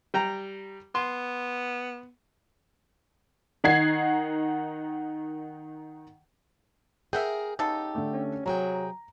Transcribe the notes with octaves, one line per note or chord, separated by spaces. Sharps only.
G3 G5 A#5
B3 C6
D#3 D#4 F#5 G#6 C7
G#4 A#4 E5 F#5 G5
C#3 B3 D#4 G4 A4
D3 A3
C#4
C3 F#3 G#4 G5 A#5